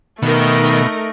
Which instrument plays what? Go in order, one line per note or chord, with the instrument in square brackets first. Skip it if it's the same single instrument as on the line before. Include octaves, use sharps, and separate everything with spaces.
[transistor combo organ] B2 [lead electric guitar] D#3 [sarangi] A3 [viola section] D#4 A#4